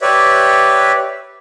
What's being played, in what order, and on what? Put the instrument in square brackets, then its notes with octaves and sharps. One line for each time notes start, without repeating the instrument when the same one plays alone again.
[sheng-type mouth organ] G4 B4 C#5 D5 E5